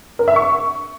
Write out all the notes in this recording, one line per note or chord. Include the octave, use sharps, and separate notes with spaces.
A#4
E5
C#6